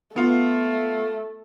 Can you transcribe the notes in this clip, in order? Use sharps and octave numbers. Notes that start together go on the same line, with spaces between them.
A3 B3 F4